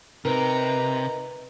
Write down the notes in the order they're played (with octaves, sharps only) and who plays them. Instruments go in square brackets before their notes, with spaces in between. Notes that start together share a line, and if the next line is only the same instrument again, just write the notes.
[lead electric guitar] C3 [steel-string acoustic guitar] D#4 A#4 [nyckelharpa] B4 A#5